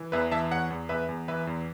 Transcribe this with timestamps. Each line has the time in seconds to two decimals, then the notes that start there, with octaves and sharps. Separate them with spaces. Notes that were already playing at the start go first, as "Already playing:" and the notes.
Already playing: E3
0.12 E2 B4 E5
0.31 E3 E5 A5
0.51 E2 C#5 F#5
0.70 E2
0.89 E2 B4 E5
1.09 E2
1.28 E3 B4 E5
1.47 E2